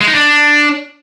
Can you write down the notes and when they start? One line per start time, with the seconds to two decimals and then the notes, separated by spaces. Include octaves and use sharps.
0.01 G#3
0.08 D#4
0.15 D4